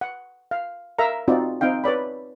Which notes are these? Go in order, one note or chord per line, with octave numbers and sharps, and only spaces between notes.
F#5
F5
A#4 E5 F5 A#5
C4 D#4 F4 F#4 D5
C4 D#4 F5 G5
B4 C#5 D5 B5